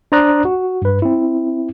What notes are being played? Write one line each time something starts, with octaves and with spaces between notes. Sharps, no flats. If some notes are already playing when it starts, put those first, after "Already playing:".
D4 C5 D5 A#5 D#6 F#6
F#4
G2 B4
C4 E4